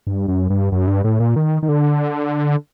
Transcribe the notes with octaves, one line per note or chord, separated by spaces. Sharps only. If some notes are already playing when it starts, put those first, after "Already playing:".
G2
F#2
G2
F#2
G2
A2
A#2
D#3
D#3
D3